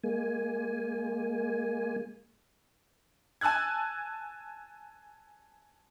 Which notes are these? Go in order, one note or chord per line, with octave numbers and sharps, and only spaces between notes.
G#3 A#3 G#5
G#5 A5 E6 F#6 G#6